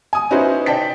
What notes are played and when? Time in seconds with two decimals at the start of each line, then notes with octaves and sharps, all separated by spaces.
0.13 G#5 D#6
0.31 C#4 D#4 E4 F#4 B4 C5
0.66 D5 G5 A5 B6